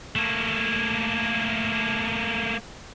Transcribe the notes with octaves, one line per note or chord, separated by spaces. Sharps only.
A3 A#3